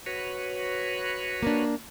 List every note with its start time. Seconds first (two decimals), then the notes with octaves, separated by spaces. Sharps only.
0.06 F#4 B4 C#5
1.43 A#3 D4